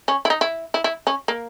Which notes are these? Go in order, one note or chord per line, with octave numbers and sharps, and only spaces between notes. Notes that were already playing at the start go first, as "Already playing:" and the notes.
C#4
E4
D#4
E4
E4
E4
C#4
A#3